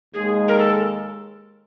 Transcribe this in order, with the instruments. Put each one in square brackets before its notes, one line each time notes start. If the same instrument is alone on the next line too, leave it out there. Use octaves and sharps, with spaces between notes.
[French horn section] D#2 D#3 G#3 [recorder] G#4
[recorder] A#4
A4